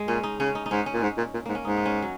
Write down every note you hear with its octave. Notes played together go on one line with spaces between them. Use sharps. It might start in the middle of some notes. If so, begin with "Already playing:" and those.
Already playing: G#3
A#2 C#4
D#4
C#3 C#4
D#4
D#4
G#2 C#4
C#4
A#2
G#2
A#2
A#2
G#2 A#3
C#4
G#2 D#4
D#4
C#4
F#3